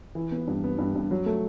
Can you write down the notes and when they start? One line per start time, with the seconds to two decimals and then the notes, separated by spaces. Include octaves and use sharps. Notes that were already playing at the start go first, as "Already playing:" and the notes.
0.15 E3
0.31 B3
0.48 G2
0.64 B3
0.78 G2
0.95 G2
1.11 F#3
1.26 A3